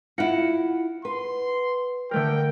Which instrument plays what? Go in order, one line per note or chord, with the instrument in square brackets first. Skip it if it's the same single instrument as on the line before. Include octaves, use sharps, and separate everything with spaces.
[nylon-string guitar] E4 F4 [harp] F#5 A#6 C#7
[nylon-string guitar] B4 [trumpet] C6
[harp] D3 A3 A#4 [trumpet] G5